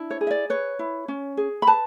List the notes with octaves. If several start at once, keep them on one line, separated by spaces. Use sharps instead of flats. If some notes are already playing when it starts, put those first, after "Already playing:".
Already playing: D4 E4
C#5
G#4
E5
D5
B4 C#5
E4
C#4
G#4
B5
B4 A5